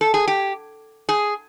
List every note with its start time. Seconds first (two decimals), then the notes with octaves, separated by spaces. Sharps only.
0.01 A4
0.14 G#4
0.28 G4
1.09 G#4